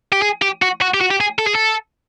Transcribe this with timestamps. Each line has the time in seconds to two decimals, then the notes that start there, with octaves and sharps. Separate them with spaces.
0.12 G4
0.22 G#4
0.42 G4
0.62 F#4
0.82 F#4
0.94 G4
1.01 F#4
1.11 G4
1.21 G#4
1.39 A4
1.47 G#4
1.55 A4